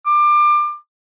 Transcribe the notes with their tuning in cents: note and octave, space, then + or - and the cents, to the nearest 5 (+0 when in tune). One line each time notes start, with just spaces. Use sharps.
D6 +25